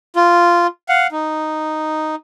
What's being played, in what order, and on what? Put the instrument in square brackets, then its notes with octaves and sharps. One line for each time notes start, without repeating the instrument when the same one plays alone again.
[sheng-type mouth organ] F4
F5 F#5
D#4